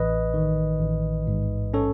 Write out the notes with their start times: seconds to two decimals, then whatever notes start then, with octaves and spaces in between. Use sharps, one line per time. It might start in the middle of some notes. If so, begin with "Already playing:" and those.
Already playing: A1 B4 D#5
0.34 D#3
0.80 A1
1.27 G#2
1.74 C#4 A4 C#5